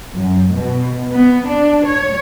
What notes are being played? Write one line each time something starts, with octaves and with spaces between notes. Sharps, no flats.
F#2
B2
B3
D4
C#5